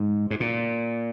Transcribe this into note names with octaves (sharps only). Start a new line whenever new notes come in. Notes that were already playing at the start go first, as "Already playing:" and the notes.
Already playing: G#2
G#2
A#2